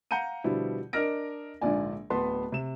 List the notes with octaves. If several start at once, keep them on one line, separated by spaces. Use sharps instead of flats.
F5 F#5 A#5 G6 C#7 D#7
B2 D3 F3 G3 E4
D4 A#4 D#5 F6 A#6 D7
A#1 G#2 D3 F4 D5 G#5
D1 B3 B4 A5 C6
C3 E7